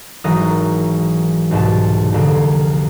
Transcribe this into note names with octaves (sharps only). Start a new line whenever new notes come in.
G#1 E3 F#3 A#4 D#6
C2 G#2 B2 A5
C2 F2 D3 A#3